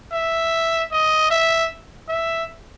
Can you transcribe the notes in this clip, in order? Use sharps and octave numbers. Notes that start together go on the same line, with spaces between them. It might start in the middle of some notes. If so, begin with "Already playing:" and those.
E5
D#5
E5
E5